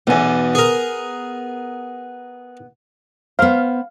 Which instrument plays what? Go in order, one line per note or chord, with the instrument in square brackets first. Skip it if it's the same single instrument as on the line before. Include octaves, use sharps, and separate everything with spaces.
[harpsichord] B1 E2 [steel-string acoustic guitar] B3 G#5
[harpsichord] G#4 A#4
[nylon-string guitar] B3 C5 [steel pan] F5